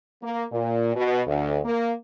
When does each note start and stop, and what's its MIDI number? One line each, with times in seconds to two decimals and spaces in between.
0.23 0.44 58
0.52 0.95 46
0.95 1.21 47
1.26 1.59 38
1.65 1.92 58